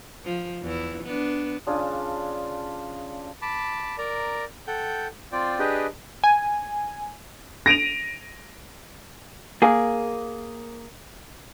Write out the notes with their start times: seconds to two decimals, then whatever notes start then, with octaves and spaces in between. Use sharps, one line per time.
0.25 F3
0.62 E2 E4
1.03 B3 D4
1.67 C#3 D4 F4 G#4
3.42 A5 B5 D6
3.98 A#4 D5 A#5
4.67 A4 F#5 G5 G6
5.32 C4 F4 D5 G5
5.59 D4 G4 G#4 B4 D#5 G5
6.24 G#5
7.66 A#6 D7 D#7 F7
9.62 A#3 G#4